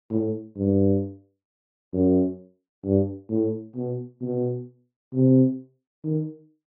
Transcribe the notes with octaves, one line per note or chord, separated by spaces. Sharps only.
A2
G2
F#2
G2
A2
B2
B2
C3
D#3